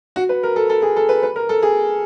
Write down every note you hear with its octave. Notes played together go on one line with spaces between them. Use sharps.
F#4
B4
A#4
A4
A4
G#4
A4
B4
B4
A#4
A4
G#4